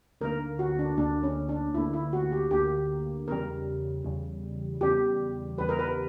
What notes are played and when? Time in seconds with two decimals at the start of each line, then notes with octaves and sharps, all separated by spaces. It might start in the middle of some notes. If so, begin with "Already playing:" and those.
0.21 D2 D3 A#3 A#4
0.59 F#4
0.79 D4
0.97 D2 D3 A#3 D4
1.23 C#4
1.49 D4
1.74 D2 E4
1.77 D3 A#3
1.93 E4
2.13 F#4
2.32 G4
2.51 D2 D3 A#3 G4
3.28 E2 C#3 G3 A#4
4.05 E2 C#3 G3
4.81 E2 C#3 G3 G4
5.58 E2 C#3 G3 B4
5.69 A#4
5.79 B4